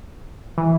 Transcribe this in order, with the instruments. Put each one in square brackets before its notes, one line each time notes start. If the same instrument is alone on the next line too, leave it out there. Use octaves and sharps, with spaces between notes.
[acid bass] E3